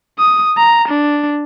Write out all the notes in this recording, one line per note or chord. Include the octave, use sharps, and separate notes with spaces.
D#6
A#5
D4